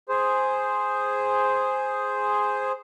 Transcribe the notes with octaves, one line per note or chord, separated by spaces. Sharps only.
G#4 C5